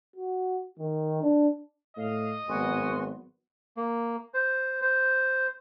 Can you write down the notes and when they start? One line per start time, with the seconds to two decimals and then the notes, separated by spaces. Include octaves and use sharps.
0.16 F#4
0.79 D#3
1.23 D4
1.97 A2 D#5 F5
2.48 G#1 F#3 B3 F#4 G#5 C6
3.77 A#3
4.34 C5
4.82 C5